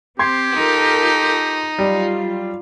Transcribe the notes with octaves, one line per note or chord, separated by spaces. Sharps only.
C4 G4 C6 G#6 C7
D#4 F4 A4 A#4
F#3 G3 F4